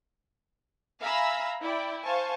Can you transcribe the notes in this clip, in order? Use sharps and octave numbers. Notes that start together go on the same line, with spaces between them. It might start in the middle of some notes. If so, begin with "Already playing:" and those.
E5 F5 G#5 A#5 B5 E6
E4 D5 G5
C5 F5 G#5 A5 C#6